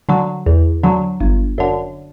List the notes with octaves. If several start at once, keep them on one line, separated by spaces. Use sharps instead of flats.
D3 F#3
E2
D3 F#3
G1
F#2 D3